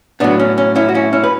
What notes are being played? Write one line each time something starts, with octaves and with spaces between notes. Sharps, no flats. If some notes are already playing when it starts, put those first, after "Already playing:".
A2 F#3 B3 D4
C#4
C#4
C#4 E4
F#4
C#4 E4
C#4 E4
B4